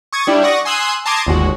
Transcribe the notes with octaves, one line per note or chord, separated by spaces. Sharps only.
C#6 D#6 G#6 A6
G3 D4 E4 G4
D5 F#5 C#6 D#6 A#6
G#5 C6 D#6 E6 F#6 G#6
A5 A#5 C6 D6 D#6 G#6
G1 D#2 G#3 F#4